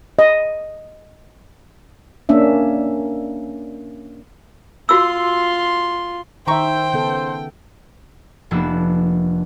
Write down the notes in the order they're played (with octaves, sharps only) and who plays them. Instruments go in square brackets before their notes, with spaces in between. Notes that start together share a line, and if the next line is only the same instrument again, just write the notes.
[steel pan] D#5
[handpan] A#3 C#4 D4 E5
[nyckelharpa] F4 C6 [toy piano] F#4 E6
[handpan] D#3 E5 [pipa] G4 A#5 C#6 [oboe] C5 [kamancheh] G5
[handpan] C#3 B3 A4
[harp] F1 F3 A#3 B3 D4 E6